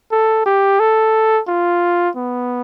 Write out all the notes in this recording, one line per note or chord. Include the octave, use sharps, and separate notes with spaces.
A4
G4
A4
F4
B3